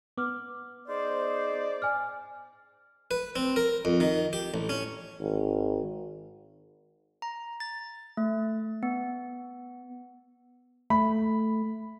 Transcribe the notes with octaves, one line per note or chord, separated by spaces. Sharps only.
B3 D6 F6
D#4 G#4 C5 D5
G#5 F6
B4
C4
A#4
F2
D#3
G4
A1
C#4
G#1
A#5
A6
A3
B3
A3 B5